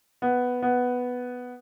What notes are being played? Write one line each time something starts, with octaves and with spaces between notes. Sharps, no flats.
B3
B3